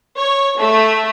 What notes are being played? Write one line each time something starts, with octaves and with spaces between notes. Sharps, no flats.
C#5
A3